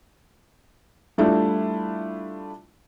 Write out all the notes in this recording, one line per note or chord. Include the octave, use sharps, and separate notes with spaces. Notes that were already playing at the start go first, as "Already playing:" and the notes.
G3 A3 D4 E4 F4